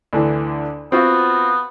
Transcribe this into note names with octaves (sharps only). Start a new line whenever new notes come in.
D2 D3 E3
B3 C4 F4 F#4